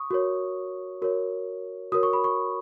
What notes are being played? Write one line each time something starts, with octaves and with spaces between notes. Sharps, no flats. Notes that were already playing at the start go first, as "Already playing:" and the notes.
Already playing: C#6 D#6
F#4 A#4 C#5
F#4 A#4 C#5
F#4 A#4 C#5 D#6
C#6
B5
C#6